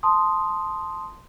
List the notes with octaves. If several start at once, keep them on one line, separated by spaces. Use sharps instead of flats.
A5 C6 D#6